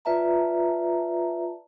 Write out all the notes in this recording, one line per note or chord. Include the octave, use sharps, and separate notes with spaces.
F4 B4 D5 E5 A5 A#5